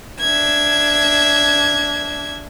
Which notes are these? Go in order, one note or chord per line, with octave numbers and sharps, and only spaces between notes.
D4 E5 G#6